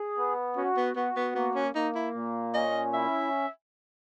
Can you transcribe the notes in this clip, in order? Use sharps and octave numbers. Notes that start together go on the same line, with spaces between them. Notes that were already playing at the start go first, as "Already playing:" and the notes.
Already playing: G#4
B3
C#4 F#4
B3
B3 F#4
B3
A#3 B3
C#4
A#3 D#4
E4
A#2
C#4 D#5
E4 E5